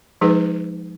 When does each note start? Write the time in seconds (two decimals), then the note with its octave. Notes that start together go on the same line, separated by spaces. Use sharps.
0.21 F3 G#3 D#4 G#4 B4